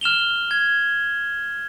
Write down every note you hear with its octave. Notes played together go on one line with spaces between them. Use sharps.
F6 E7 F7 G7
G#6